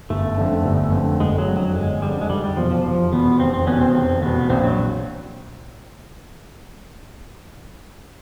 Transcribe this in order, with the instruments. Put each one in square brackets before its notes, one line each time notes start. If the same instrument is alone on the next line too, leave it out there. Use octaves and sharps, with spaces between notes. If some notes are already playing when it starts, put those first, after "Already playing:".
[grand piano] G1 [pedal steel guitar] A3
[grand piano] F2 D3
G1
F2 D3
[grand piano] G1 [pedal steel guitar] G#3
[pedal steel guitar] F#3
[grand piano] F2 D3
[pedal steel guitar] F#3
[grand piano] G1 [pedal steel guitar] G#3
[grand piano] F2 D3 [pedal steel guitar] G3
[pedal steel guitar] G#3
[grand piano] F1 [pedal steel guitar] G3
[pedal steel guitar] G3
[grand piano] E2 B2 [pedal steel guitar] F3
[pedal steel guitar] F3
[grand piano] F1 [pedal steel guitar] F3
[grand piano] E2 B2 [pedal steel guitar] B3
[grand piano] F1 [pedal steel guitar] C4
[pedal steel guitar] C4
[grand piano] E2 B2 [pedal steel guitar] B3 C#4
[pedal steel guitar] C4
[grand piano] F1 [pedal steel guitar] C4
[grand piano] E2 B2 [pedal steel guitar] B3
[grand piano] A#1 [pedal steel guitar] C4
[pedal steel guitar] F#3